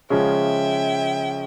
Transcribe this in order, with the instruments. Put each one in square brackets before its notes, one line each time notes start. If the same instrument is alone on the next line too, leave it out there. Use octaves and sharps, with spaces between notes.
[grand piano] C#3 F3 G#3 C#4 [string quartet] E5 G5